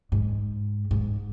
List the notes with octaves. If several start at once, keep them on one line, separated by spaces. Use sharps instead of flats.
G#2
G#2